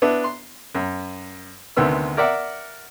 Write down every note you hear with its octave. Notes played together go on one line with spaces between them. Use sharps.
B3 D4 E4
C6
F#2
D2 C3 D#3 B3 E6
A#4 D5 E5 F#5